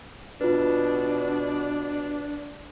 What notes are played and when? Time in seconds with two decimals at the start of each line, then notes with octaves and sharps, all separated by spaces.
0.41 B2 D4 F4 B4